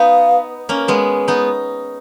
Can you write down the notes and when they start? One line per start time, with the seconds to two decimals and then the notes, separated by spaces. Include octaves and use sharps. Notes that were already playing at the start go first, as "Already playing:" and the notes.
Already playing: B3 D#4 F5
0.69 A#3 C#4
0.88 G#3 B3
1.28 B3 D#4